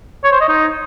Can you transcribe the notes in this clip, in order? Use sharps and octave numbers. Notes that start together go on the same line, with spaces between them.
C#5
C5
D#5
D#4